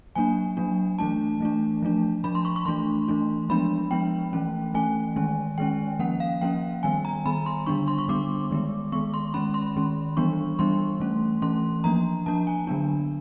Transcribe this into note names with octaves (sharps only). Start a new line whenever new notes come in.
F#3 A#3 D4 G#5
F#3 A#3 D4
E3 A3 D4 A5
E3 A3 D4
F3 A3 D4
F3 A3 D4 B5
C6
C#6
C#6
E3 A3 D4 C6
E3 A3 D4
F3 G#3 B3 D4 B5
F3 G#3 B3 D4 G5
E3 A3 C#4
E3 A3 C#4 G#5
D#3 G#3 C#4
D#3 G#3 C#4 G5
F3 A#3 C#4 F#5
F5
F3 A#3 C#4 G5
D#3 G3 B3 G#5
A#5
D#3 G3 B3 B5
C6
D3 G3 B3 D4 C#6
C6
C#6
D3 G3 B3 D4 D6
D#3 G#3 B3
D#3 G#3 B3 C#6
C6
D#3 G#3 C#4 B5
C6
D#3 G#3 C#4
E3 G3 B3 D4 C#6
E3 G3 B3 D4 C6
E3 A3 C#4
E3 A3 C#4 C6
F3 A#3 D4 A#5
F3 A#3 D4 A5
G#5
D3 F#3 B3 D4